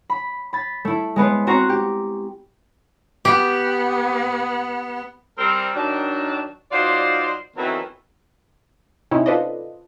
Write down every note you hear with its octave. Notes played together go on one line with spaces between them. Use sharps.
B5
B5 A6
A3 E4
G#3 B3 B4 C5
C4 F#4 C5 A#5 C#6 F#6
G4
B3 G4
G3 C4 A#4
D#3 F#3 D4
F#3 D#4 F4 C5 D5
D#3 E3 F#3 A3 B3 C4
C3 C#4 D#4 E4
F4 A4 B4 C5 D5 D#5